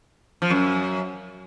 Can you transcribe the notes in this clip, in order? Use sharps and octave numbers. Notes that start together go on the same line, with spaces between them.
F3
F#2